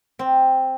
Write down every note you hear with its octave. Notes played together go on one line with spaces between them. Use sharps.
C4